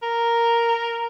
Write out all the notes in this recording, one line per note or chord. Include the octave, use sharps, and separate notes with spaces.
A#4